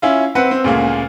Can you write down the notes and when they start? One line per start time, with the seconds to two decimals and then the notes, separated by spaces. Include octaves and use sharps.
0.02 C#4 E4 F4
0.35 C4 B4 F#5
0.51 C4
0.64 D2 A#2 C#3 G#3 A#3